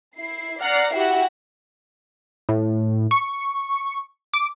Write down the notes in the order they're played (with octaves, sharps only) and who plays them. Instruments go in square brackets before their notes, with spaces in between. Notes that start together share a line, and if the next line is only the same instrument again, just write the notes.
[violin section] E4 C7
D5 F#5 A#5 F6 F#6 C7
E4 F#4 G4 E5 F#5
[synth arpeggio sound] A2
C#6
D6